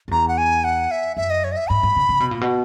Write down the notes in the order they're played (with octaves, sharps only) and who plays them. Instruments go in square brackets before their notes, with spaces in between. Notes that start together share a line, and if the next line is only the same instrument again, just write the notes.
[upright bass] F#2
[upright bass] E2 [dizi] A#5
[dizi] F#5
G#5
F#5
E5
[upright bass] F#2 [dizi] E5
[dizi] D#5
C#5
D#5
E5
[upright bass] G#2 [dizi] B5
[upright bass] G#2
C#3
C#3
B2
A#2
B2